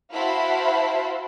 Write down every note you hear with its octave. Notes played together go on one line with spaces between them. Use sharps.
E4 F#4 C5 F5 A5 B5